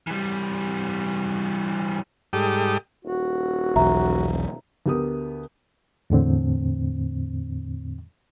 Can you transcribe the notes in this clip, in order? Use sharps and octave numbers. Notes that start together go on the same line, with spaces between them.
E3 G3
G#2 G3 G4 A4 D#6
D#1 F#4
B1 E2 E5 A#5
D2 B3 G4 A#4 D#6
E2 A2 D3 C4